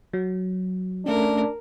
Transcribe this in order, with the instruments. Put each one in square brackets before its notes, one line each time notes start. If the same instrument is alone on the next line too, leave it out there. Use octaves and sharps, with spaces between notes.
[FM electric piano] F#3
[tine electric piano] A3 C#4 [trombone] D4 [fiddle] A#4